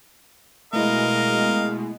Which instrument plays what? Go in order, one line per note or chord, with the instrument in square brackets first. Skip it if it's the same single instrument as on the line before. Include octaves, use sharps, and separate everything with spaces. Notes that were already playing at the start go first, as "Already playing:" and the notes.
[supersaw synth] B2 G#3 [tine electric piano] A3 E4 [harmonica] A#4 D#5 F5